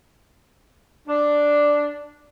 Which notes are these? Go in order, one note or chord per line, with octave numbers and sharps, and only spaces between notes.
D4